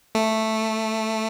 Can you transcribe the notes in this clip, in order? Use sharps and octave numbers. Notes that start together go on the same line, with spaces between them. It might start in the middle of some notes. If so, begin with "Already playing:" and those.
A3